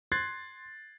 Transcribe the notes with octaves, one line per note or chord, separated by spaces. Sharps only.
C6 F#6 G#6 A6 C7